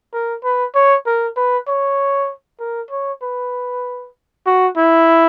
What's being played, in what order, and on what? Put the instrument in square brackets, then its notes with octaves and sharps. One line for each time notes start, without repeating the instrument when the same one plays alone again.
[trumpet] A#4
B4
C#5
A#4
B4
C#5
A#4
C#5
B4
F#4
E4